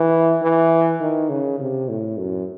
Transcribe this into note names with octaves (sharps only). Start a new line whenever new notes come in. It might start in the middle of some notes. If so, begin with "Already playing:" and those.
Already playing: E3
E3
D#3
C#3
C3
A2
F#2